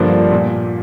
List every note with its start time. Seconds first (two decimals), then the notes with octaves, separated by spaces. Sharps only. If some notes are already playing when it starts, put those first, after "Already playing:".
Already playing: G2 D3 F3 A#3 D4 C5
0.32 A#2